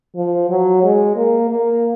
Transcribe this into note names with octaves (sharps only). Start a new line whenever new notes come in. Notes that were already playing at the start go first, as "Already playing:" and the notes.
F3
F#3
G#3
A#3
A#3